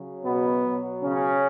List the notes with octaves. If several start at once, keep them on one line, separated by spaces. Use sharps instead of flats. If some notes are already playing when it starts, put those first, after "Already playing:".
Already playing: C#3 F#3
B2 B3
B2 F#3
C#3 C#4